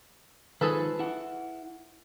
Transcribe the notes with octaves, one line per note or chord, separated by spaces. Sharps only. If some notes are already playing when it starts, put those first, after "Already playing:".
D#3 F3 G#3 G#4 A4 B4
E4 F#5